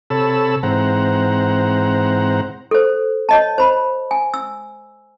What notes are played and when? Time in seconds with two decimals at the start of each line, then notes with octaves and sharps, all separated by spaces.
0.10 C3 A4 C#5 A5 B5 E6
0.63 G#2 E3 C4 C5 F#5 A#5
2.71 A4 C5
3.29 C#5 D#5 A5
3.58 C5 B5
4.11 G#5
4.34 E6